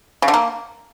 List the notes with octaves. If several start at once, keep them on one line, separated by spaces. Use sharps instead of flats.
C#3
D3
A#3